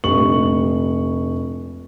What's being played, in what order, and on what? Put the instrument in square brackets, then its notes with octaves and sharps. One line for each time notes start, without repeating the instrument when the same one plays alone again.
[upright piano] F1 A#1 G3 C#6 F#7